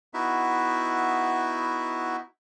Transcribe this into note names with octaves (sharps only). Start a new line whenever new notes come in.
B3 D#4 E4 F#4 E5